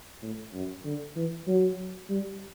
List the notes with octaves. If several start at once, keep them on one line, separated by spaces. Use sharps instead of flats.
A2
F#2
D3
E3
F#3
G3